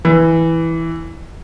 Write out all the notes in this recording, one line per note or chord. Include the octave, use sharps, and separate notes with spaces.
E3